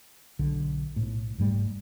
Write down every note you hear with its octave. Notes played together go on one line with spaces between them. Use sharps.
B1 D3
B1 A2
F1 G#2 G3 A3